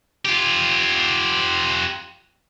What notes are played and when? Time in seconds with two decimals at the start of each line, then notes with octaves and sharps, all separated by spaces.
0.25 F4 G4